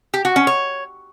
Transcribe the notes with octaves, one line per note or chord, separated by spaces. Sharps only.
G4
F#4
C#4
C#5